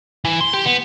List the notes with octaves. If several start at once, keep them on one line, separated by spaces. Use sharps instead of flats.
E3
C6
G4
B3